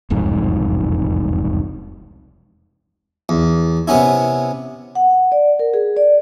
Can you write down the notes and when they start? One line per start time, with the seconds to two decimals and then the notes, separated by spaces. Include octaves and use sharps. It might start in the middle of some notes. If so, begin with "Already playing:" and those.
0.10 E1 C2 F2 G#2
3.29 E2
3.88 C3 B3 C#4 E4
4.95 F#5
5.32 D5
5.59 A#4
5.74 G#4
5.97 D5